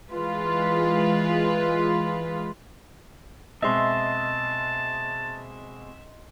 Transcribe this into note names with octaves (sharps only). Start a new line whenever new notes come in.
E3 G#3 F4 B4
B2 G#3 C4 D#5 E5 A5 C6